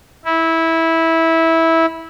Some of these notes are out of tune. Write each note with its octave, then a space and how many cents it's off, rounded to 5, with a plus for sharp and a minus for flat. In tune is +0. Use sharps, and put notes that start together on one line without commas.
E4 -15